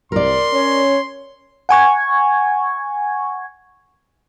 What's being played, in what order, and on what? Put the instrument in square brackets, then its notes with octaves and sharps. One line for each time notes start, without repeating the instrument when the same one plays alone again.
[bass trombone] C2 [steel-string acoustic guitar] A#4 D5 [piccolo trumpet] C6
[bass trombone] C#4 [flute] C#5
[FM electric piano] F#5 G#5 C#6 G#6